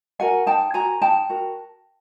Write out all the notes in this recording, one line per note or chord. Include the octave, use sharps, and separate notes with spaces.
F#4 A#4 F#5 G#5
D#4 G5 A5
F#4 A#4 G#5 A#5
D#4 G5 A5
F#4 A#4